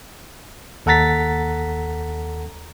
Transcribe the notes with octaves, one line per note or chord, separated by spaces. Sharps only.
D#2 A4 F#5 A#5 A6 B6